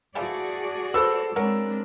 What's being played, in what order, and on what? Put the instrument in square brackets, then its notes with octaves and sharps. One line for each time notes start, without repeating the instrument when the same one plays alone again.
[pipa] E3 F3 A3 [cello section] F#4 G#4 D5
[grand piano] A4 E6 [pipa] B4 C5
[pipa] E3 F#3 [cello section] G#3 C4 D4 [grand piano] A#4